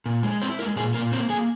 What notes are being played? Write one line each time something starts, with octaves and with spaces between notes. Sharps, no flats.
A#2
G#3
C4 E4 C5
G#3 A#3 A#4
A#2 G#3 G#4
A#2 A#3 A#4
A#3 C4 C5
A#3 G#4 G#5